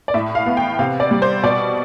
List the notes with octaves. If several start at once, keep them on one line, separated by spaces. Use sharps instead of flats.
D5
A2 E5
F5
B3
G5
C3 F5
D5
G3
C5
B2 D5